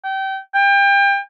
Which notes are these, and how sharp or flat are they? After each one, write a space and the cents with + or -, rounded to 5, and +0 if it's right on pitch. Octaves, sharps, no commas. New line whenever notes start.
G5 -25
G5 +30